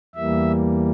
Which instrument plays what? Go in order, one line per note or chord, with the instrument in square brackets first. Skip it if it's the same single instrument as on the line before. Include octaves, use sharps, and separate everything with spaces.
[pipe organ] E2 E3 G3 A#3 E5